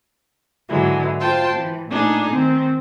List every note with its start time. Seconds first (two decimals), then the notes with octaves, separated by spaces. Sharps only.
0.68 G#2 D3 E3 F#3 G#3
1.19 F4 C5 G5 A5 C6
1.56 E3
1.88 A#2 A3 D4 D#4 G#4
2.33 D#3 C4